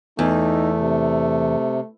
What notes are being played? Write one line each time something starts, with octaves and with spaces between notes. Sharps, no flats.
E2 A3 D#4
C3